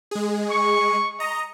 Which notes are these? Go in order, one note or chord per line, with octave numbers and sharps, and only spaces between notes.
G#3 G#4
C#6
D#5 A#5